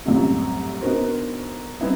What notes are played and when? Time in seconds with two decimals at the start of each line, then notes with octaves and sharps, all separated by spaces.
0.06 C2 F#2 A2 C3
0.81 B3 D4 D#4 F#4 A#4 C5
1.81 G3 B3 C4 D#4 E4